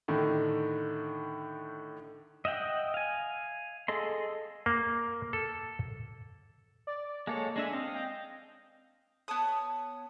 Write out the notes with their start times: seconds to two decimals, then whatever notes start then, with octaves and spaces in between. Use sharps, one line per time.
0.08 A2 D3 D#3
2.45 D#5 E5 F#5 G5
2.94 F5 G#5
3.88 G#4 A4 D#5 C6
4.66 A#3
5.33 A4
6.87 D5
7.27 G#3 A#3 A4 C#5
7.56 G#3 D4 E5 G#5
7.73 C4 D#5 F5
7.95 G5
9.28 B3 C#5 A5 D#6